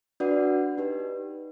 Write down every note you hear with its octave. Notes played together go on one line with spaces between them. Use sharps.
D4 F#4 B4 D5 F#5
D#4 G4 B4